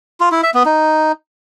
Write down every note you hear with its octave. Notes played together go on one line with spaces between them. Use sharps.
F4
E4
E5
B3
D#4